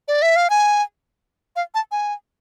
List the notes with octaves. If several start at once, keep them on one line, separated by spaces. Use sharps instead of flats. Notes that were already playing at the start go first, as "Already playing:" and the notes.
D5
E5
F5
G#5
F5
A5
G#5